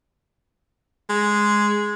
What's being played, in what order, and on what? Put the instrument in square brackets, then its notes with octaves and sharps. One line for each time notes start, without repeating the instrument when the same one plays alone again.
[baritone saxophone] G#3